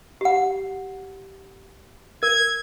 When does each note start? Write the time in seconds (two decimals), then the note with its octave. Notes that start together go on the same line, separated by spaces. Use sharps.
0.21 G4 F#5
2.23 A#4 G#6